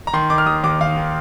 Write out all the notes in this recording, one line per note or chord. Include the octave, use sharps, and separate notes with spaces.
A#5
D#3 C6
D#3 D6
F6
D#2 D#6
D#2 D6
D#3 F5
D#3